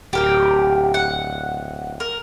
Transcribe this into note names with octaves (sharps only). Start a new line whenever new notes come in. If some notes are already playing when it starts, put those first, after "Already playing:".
D1 G4 A#4 G5
F#5
A#4